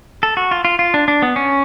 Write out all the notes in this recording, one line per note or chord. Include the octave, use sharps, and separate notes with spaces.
A4
F#4
F4
F4
F4
D4
D4
B3
C#4